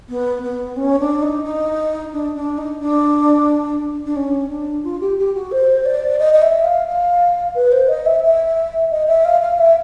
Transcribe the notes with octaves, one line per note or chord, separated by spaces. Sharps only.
B3
B3
C#4
D4
D#4
D#4
D4
D4
D#4
D4
D4
C#4
D4
F4
G4
G4
F#4
C5
D5
D#5
D#5
E5
F5
F5
B4
C5
D#5
E5
E5
D#5
E5
F5
F5
E5